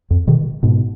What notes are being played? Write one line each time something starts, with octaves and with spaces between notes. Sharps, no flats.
F2
B2 D#3
G#2 B2